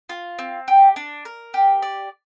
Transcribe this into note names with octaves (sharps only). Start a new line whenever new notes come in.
F4
C4
G4
D4
A#4
G4
D5